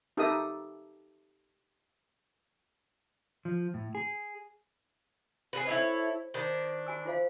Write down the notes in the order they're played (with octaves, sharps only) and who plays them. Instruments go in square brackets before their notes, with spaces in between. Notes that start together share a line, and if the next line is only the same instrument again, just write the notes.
[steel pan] D#4 G4 A4 A#4 E5 D#6
[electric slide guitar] F3
A2
G#4
[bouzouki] G#4 A4 B4
[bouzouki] E4 A4 C#5 [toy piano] C5 D#5
[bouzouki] D#3 D4 [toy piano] C5 B5
[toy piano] F#4 G#5 E6
F4 C5 F5